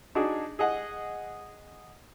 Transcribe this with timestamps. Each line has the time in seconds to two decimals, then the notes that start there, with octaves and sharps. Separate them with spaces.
0.15 D4 D#4 F#4 G#4
0.59 G#4 D#5 F#5